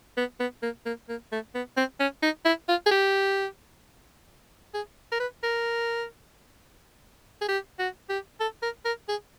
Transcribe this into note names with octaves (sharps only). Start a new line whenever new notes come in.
B3
B3
A#3
A#3
A#3
A3
B3
C4
C#4
D#4
E4
F4
G#4
G4
G#4
A#4
B4
A#4
G#4
G4
F#4
G4
A4
A#4
A#4
G#4